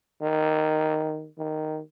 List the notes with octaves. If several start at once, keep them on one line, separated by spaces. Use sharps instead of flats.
D#3
D#3